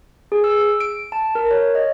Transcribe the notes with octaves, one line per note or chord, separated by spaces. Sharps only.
G#4
E6
D7
A5
A#4
C#5
D#5